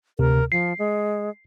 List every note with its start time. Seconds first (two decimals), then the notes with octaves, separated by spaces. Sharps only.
0.19 D2 C3 A#4
0.52 F3 C7
0.79 G#3